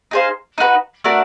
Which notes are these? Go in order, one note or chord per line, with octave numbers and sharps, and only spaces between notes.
D#4 G#4 C5 F5
D#4 F#4 B4
A3 D4 F#4 A#4